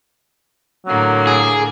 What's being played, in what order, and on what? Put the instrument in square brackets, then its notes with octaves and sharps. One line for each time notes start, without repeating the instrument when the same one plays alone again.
[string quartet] A2 D3 A#3 [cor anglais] F#3
[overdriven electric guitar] G#4